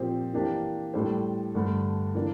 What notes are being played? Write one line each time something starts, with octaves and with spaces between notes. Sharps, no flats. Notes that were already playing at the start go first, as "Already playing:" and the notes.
Already playing: A#2 F3 C4 G4 C5
E3 A#3 D4 G4
A2 G3 D4 A4 C5
G2 D3 A3 D4
E3 A#3 D4